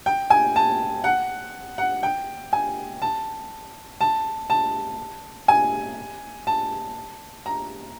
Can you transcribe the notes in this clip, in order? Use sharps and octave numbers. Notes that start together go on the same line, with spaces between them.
G5
G#5
A5
F#5
F#5
G5
G#5
A5
A5
A5
G#5
A5
A#5